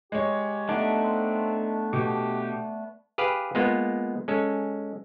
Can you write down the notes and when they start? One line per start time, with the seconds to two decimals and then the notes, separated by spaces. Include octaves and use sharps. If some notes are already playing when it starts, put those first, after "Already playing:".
0.12 G#3 G4 C#5
0.69 A3 B3 D4 D#4
1.02 C4
1.93 B2 G4
3.18 G4 G#4 B4 F5
3.55 G#3 A#3 B3 F4
4.28 G#3 C#4 A4